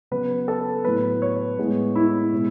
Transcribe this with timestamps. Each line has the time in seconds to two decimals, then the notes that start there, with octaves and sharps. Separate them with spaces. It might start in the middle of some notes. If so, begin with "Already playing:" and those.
0.11 C#3 F#3 B3 B4
0.48 A4
0.84 A2 F#3 B3 B4
1.22 C#5
1.58 A2 G#3 B3
1.96 E4
2.32 B2 G#3